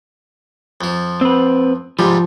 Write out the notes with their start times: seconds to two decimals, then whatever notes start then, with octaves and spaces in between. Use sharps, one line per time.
0.81 F2 F3
1.21 C4 B4
1.99 G#2 C3 F3 G3